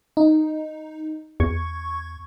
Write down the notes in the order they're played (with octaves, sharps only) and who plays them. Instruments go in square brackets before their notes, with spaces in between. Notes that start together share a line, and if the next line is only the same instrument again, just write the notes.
[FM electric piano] D#4
[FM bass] E2 [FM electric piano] C#6 G#6